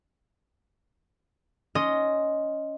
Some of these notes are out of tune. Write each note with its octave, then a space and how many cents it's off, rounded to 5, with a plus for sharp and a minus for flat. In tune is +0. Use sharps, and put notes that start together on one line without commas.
C#4 +15 D#5 +0 C6 +0